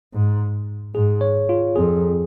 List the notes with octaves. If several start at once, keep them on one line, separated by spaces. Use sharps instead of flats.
G#2
G#2 G#4
C#5
F4
F2 G#4